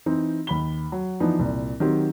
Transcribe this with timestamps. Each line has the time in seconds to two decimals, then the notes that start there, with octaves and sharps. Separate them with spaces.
0.06 E3 C4 D#4
0.47 D#2 B5 G7
0.92 F#3
1.20 E3 F3 B3 D4 D#4 B4
1.39 C2 A#2
1.80 D#3 F#3 C4 G4